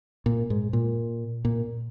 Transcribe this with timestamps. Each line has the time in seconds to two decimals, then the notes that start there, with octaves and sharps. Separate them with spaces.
0.26 A#2
0.50 G#2
0.73 A#2
1.45 A#2